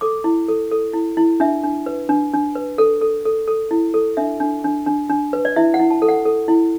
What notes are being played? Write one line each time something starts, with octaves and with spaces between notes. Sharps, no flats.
A4 D6
E4
A4
A4
E4
E4
D4 E5
D4
B4
D4
D4
B4
A4
A4
A4
A4
E4
A4
D4 E5
D4
D4
D4
D4
B4
D5
E4 E5
F#5
E4
A5
A4
F#5
A4
E4